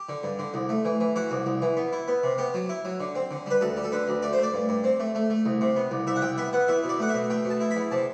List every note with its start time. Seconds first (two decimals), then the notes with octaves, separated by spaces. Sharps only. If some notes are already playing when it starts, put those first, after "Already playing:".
Already playing: G4
0.09 D3
0.23 G2
0.39 D3
0.54 C2
0.69 A3
0.85 E3
1.00 E3
1.16 E3 F#4
1.31 C2
1.46 C2
1.62 E3
1.77 B3
1.93 E4
2.08 B3
2.23 C3
2.38 B3 G4
2.54 F#3
2.69 E4
2.85 F#3
3.00 D3
3.15 C4
3.31 D3
3.46 G3 B4
3.61 D2 A4
3.77 G3
3.84 A4
3.92 D3 B4
4.08 D2
4.22 A3 D5
4.33 C5
4.38 A3 D5
4.54 G2
4.69 G2
4.84 C4
5.00 A3
5.15 A3
5.30 A3
5.46 C2
5.61 C3
5.76 B3
5.91 C2
6.07 C2 E5
6.16 F#5
6.22 C2 G5
6.38 B3 E5
6.53 B3 F#5
6.68 E2 E5
6.84 B2
6.89 D5
6.99 A3 F#5
7.09 E5
7.15 B2
7.30 A3 G5
7.45 B2
7.50 A5
7.60 E4
7.71 E2 B5
7.91 C3 A5